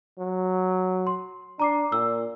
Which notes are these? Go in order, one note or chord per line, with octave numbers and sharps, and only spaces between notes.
F#3
C6
D4 A#5 D6 C7
A#2 E6